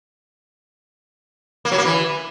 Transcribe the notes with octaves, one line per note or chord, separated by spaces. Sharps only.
A#3
F#3
A#3
E3